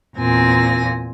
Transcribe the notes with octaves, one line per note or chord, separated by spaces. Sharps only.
E2 A#2 C4 G#5 A#6